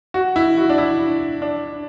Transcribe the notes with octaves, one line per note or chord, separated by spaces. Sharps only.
F#4
E4
F#4
D4
E4
D4